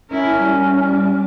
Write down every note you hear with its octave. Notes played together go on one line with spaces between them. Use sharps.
C#4 E4 A#4
G3
G3